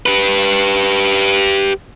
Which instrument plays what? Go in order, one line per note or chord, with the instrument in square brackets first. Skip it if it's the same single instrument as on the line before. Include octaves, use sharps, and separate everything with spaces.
[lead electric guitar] G4 B4